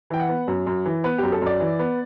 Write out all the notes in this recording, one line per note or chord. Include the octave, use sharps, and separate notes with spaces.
E3 G5
F#5
B3
F#2
F#2
E3
B3 B4
F#2 G4
A4
F#2 D5
E3
B3